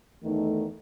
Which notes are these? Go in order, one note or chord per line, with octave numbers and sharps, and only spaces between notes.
E2 D#3 A3 D#4